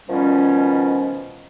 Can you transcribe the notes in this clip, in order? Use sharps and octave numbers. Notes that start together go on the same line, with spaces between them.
B2 D#3 F3 G3 C#4